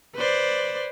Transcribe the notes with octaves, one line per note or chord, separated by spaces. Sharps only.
B4 C5 D5